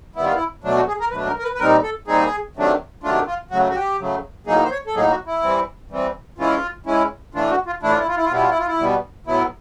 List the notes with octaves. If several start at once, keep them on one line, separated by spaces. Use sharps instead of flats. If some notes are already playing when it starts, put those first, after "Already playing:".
D#3 G3 B3 E4
F4
E4
B2 F#3 A3 D4
F#4
G#4
A#4
B2 F#3 A3 D4 B4
A#4
A#4
B4
B4
A#2 G3 C4 D#4 A#4
A4
A#2 G3 C4 D#4 G#4
C3 D#3 F#3 A3 D4
C3 D#3 F#3 A3 D4 F4
F4
C#3 F#3 A3 F#4
F#4
G4
C#3 F#3 A3
A2 F#3 A#3 D#4 G#4
C5
C#5
A4
A2 F#3 A#3 D#4 G#4
F#4
E4
E3 G3 C4
E3 G3 C4
E3 G#3 C#4 E4 F4
E3 G#3 C#4 E4
A2 E3 A3 D4 F4
F#4
F4
A2 E3 A3 D4 E4
F4
E4
F4
E4
F4
B2 G3 B3 E4
F4
E4
F4
E4
B2 G3 B3
A2 F#3 B3 E4